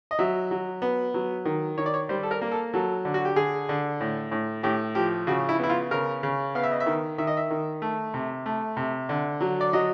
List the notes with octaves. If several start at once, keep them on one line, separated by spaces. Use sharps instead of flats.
D#5
F#3 E5
F#3
B3
F#3
D#3
D#3 C#5
D5
C#5
G3 C5
A4
A#4
A#3
A4
F#3 A4
D3
F#4
G4
D3 G#4
D3
A2
A2
A2 G4
F3 G4
C#3 F#4
E4
B3 E4
F4
C#3 A#4
C#3
B3 F5
E5
D#5
E5
D#3
D#3 E5
D#5
E5
D#3
A3
C3
A3
C3
D3
F#3
D5
F#3 D#5